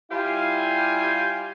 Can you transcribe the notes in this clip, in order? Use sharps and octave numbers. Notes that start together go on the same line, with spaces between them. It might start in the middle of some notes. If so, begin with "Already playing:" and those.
G3 E4 F4 G4 F5 G#5